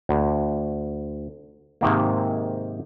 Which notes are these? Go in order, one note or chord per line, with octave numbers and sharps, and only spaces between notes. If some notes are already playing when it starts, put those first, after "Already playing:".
D2
G#2 C3 D#3 A#3